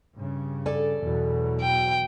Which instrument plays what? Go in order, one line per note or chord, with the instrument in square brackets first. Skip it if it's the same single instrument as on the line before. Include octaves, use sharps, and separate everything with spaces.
[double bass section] G2 C#3
[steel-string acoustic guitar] A4 D5 G#5
[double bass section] E2 B2 F#3
[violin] G5